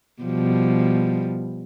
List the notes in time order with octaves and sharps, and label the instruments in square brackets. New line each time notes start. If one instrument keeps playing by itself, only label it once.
[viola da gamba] B2 F3 G3